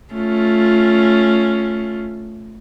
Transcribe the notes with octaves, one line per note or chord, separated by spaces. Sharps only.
A3 C#4 F4